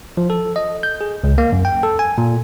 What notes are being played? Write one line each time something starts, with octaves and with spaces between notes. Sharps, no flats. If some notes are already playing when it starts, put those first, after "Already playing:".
F3
A4
D#5
G6
G#4
C#2
A#3
F#2
G5
A4
G#5
A#2